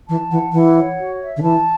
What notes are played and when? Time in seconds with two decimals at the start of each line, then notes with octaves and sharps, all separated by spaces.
0.08 E3 A5
0.31 E3 F#5
0.53 E3 F#5
0.76 C#5
0.98 F#4
1.20 E5
1.37 D3
1.42 E3 A5